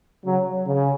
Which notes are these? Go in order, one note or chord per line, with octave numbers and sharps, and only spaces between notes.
C#3 F#3
C#3